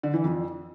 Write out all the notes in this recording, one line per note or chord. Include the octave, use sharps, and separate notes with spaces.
D3
E3
F2